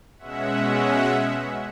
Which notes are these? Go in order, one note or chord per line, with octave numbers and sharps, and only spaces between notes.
B2 G#3 C#4 E5 F#5
E5 F#5